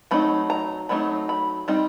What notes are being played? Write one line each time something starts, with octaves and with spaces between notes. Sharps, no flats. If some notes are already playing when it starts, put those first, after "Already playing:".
F#3 A3 C4 D#4 B5
A#5
F#3 A3 C4 D#4 B5
B5
G3 C4 D#4